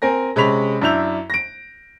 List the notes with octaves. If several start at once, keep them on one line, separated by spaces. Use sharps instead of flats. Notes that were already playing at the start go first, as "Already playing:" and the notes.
C4 A#4 G#5 A#6
C3 G#3 C#4 B5 B6 F7
F#2 D4 E4 E6 G6 F7
A#6 D7